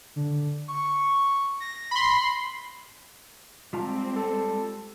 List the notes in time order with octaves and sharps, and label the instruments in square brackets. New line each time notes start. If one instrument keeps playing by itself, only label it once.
[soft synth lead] D3
C#6
A#6
[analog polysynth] B5 C6
[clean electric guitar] G3 F4 A5 [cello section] G#3 C4
[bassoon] A4